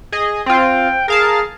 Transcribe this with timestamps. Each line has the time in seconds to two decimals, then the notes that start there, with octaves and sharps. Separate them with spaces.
0.12 G#4 D#5
0.46 C4 F4 G5
1.08 G#4 A#4 F5 A5